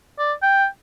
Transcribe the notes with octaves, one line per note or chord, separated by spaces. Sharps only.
D5
G5